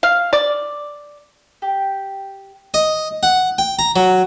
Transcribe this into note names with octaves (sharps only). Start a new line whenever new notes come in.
F5
D5
G4
D#5
F#5
G5
A#5
F#3